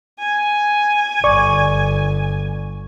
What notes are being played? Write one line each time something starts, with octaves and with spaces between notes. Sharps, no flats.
G#5
G1 D5 C#6